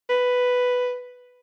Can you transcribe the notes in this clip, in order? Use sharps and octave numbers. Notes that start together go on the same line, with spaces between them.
B4